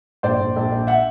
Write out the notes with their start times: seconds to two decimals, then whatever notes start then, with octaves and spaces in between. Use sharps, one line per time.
0.23 A#1 C5 D5
0.39 A#1
0.56 A#1
0.71 A#1
0.87 E5 F#5